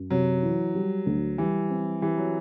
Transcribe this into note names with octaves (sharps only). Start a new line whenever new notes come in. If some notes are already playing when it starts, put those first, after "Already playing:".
Already playing: F#2
C3 F#3
E3
G3
D2
E3 G3
C4
E3 G4
F#3